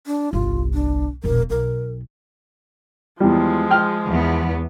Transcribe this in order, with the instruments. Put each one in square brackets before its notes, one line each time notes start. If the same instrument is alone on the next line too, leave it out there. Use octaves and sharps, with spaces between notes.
[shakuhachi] D4
[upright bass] G1 C2 [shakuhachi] F4
[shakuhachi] D4
[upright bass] E1 A#1 [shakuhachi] A#4
[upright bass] B1 [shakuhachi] A#4
[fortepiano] E2 G3 [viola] F3 G#3
[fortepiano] G5 F6
[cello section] E2 B3